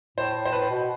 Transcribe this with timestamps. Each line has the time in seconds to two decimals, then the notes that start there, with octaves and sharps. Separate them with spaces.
0.18 A2 C5
0.35 A2
0.45 C5
0.52 A2 B4
0.71 B2